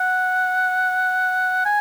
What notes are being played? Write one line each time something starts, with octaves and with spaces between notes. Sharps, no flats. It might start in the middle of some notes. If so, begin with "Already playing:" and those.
Already playing: F#5
G#5